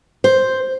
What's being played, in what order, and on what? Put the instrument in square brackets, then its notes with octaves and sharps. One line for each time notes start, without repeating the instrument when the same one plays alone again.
[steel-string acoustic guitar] C5